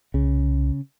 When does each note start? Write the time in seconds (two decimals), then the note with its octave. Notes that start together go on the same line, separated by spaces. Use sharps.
0.14 C2 C#3